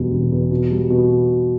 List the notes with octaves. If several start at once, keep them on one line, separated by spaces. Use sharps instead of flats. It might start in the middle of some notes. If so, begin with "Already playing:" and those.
Already playing: E1 E2 B2 G3
E1
E2
B2
G3
B2